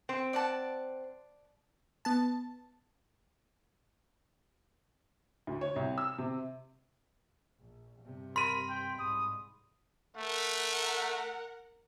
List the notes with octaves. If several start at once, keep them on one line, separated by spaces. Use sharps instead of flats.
C4
D5 F#5 A5
B3 A5
D2
C#5
C2
E6
C3
A#1
G2 C3
A#4 B5 C6 D#7
G5
C2 G#2 D#6
A3 A#4 F#5